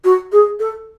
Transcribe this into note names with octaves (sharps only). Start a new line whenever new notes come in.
F#4
G#4
A4